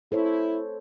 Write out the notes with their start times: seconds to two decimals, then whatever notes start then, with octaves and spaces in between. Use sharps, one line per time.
0.12 E4 A4 C5 C#5